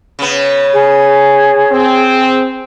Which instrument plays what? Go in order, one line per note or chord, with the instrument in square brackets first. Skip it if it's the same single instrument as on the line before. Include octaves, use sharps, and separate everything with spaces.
[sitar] C#3 B3
[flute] G#4
[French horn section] C4